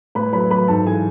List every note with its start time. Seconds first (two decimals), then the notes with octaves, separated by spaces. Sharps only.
0.15 A2 B4 B5
0.33 F#3 B4 B5
0.50 F#3 B4 B5
0.68 G#2 A4 A5
0.85 E3 G#4 G#5